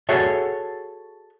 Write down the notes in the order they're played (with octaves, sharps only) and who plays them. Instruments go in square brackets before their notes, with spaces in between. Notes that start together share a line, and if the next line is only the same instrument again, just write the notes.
[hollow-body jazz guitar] F#4 G#4 A4 C#5 E5